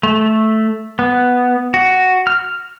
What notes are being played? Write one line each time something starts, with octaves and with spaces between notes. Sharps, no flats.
A3
B3
F#4
F6